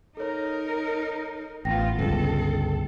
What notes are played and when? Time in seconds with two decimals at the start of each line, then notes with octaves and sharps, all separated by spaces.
0.17 D#4 A4 A#4 C#5
1.65 A1 B3 F4 G5 A#6
1.99 G1 C#2 A4